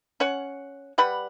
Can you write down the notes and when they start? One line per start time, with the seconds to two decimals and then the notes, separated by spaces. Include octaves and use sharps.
0.20 C#4 C#5 F#5
0.98 G3 B4 F#5 B5